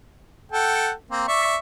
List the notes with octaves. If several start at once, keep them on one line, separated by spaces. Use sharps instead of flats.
A4 F#5 G5
A#3 C4
D5 E5 C#6